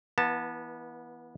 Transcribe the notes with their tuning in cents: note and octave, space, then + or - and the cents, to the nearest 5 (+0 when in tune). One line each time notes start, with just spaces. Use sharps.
E3 +0 B3 -25 A5 +10